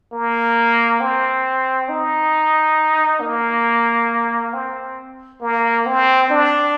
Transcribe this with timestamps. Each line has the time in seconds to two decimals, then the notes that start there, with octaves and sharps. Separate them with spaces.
0.12 A#3
1.00 C4
1.89 D#4
3.21 A#3
4.53 C4
5.41 A#3
5.86 C4
6.30 D4